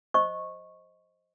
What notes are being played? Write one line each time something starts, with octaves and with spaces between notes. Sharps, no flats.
C5 D#5 C#6